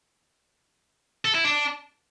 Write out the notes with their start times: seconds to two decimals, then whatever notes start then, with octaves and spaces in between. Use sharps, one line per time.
1.25 A4
1.35 E4
1.44 D4